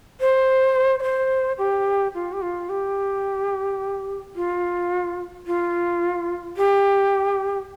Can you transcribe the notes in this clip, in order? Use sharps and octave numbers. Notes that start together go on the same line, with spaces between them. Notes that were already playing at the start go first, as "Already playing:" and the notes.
C5
D5
C5
G4
F4
G4
F4
G4
F4
F4
G4